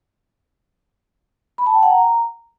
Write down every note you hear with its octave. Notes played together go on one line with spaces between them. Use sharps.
B5
A5
G5
F#5
A#5